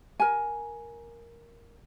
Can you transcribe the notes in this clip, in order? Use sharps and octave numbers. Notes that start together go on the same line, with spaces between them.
A#4 G#5